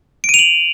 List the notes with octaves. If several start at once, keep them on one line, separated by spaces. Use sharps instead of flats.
D7
D#7
F7
F#7